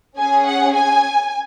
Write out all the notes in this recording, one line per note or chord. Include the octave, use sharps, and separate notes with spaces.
C#4 G#4 G#5
F#5
G#5